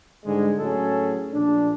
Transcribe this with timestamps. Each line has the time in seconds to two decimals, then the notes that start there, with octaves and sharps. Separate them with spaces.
0.25 G#2 D3 G3 G#3
0.58 A2 F#3 C#4 G#4 A4
1.33 A#1 D4